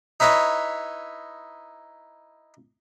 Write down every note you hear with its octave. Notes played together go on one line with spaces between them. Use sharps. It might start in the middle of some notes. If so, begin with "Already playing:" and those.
D#4 E4 B4 C#5 D#5